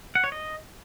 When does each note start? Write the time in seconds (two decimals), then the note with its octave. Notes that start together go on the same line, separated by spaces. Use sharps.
0.15 F#5
0.24 C#5
0.32 D#5